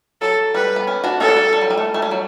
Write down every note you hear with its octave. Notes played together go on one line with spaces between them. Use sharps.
F#3 A4
G3 B4
B3
C#4
D4 F#4
C#4 E4 A4
D4
G3
G3
F#3
G3
A3
A3
G3
F#3